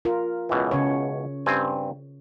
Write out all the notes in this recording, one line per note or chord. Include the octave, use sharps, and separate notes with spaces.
F4 A#4
C#2 B2 E3
C#3 C#5
G2 C4 G#5